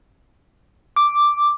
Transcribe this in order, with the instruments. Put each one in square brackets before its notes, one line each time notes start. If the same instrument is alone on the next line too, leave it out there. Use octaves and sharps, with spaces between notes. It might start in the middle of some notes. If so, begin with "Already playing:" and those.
[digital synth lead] D6